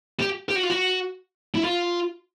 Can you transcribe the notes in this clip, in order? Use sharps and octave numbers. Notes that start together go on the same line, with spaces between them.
G4
G4
F#4
F4
F#4
E4
F4